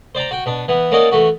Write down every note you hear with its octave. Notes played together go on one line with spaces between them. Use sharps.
C5 D5 G5 A#5
F#4 G5
B2 D4
E3 B3
A#3 C#4 F#4 A#4 D5 D#5
E3 A3 F#4